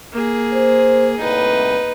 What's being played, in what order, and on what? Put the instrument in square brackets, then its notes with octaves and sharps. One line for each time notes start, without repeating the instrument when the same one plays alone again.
[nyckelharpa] A#3 G#4
[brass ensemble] C5
[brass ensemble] C2 A2 [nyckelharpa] D#4 B4